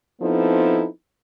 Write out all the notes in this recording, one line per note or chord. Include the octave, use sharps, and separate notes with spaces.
F3 B3 C4 D#4 E4 A4